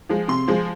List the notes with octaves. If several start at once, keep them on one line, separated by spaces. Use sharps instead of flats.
F3 G#3
C3 C6
F3 G#3